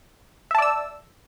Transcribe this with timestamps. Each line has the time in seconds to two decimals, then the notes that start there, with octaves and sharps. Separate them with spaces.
0.51 E5
0.55 A5
0.58 D5
0.62 E6